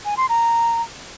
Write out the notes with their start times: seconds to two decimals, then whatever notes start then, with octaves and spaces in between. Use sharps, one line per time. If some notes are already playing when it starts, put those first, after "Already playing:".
0.05 G#5
0.17 C6
0.29 A#5